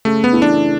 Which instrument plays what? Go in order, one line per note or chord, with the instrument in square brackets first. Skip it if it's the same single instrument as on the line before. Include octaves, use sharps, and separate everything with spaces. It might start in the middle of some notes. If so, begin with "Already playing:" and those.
[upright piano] C#3 [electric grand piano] A3
[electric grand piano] B3
[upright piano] E3 A3 E4
[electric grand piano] D4